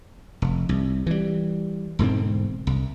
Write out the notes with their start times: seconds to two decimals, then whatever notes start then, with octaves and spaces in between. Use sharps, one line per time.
0.42 F1
0.69 C2
1.07 E3 G3
1.99 E1 G#2 D3 C4
2.67 C2